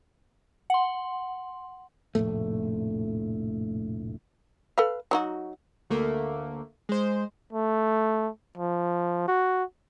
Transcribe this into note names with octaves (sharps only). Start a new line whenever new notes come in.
F#5 C6
F1 A#1 A2 A3
A4 B4 F5
F#3 D#4 F#4
D2 A3 A#3
G#3 C5
A3
F3
F#4